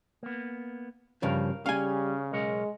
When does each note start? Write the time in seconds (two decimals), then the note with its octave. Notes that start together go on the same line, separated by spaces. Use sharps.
0.23 A#3 B3
1.22 G2 C#3 F3 A#4 F5
1.66 C#3 G3 C#4 F5 G#5
2.32 B1 G#3 A#4 C#5